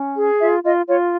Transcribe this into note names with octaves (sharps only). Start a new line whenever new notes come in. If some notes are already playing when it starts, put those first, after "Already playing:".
Already playing: C#4
G#4
F4 E5
F4 D#5
F4 C#5